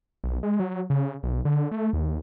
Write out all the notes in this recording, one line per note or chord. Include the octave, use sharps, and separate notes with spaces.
B1
G#3
F#3
C#3
B1
D3
A3
D#2